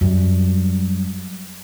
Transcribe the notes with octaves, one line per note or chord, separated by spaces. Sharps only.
F#2 G3